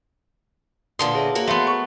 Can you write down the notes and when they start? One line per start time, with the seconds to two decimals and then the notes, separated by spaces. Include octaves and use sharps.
0.99 A#2 D3 B3 F5 A5 C6 D#6
1.15 G#4 C#5 E5
1.35 A#3 F#4 A#4
1.47 A3 B3 C6
1.67 C#6